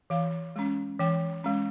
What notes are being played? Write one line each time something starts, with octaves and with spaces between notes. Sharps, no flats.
E3 F5
G#3 C#4
E3 G5
G#3 C#4